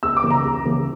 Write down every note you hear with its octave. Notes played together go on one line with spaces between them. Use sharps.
C#2 E6
D6
C#3 E3
A#5
C#2
C#3 E3